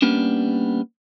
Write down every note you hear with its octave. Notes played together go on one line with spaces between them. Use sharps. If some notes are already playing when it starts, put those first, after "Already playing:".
G3 A#3 B3 C#4 D4